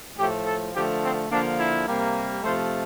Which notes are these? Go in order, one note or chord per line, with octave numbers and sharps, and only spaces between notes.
A2 F3 A3 G4
A4
D3 F3 A3 G4
C4
D3 F3 A#3 D4
E4
C3 G3 A#3
C3 F3 A3 C5